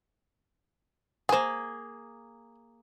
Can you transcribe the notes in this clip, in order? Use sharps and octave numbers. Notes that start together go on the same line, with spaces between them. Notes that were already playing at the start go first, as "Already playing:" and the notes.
A#3 G#4 C5 G#5